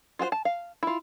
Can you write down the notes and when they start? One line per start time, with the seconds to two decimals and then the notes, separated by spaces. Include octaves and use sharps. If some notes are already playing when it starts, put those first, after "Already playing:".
0.19 F4 F#4 G#4 C5
0.32 A5
0.45 F5
0.83 E4 F4